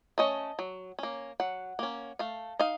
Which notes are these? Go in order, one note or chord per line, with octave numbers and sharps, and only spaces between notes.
A3 C#4 D#5
F#3
A#3 C#4
F#3 F#5
A#3 C#4
A3 F5
D#4 F5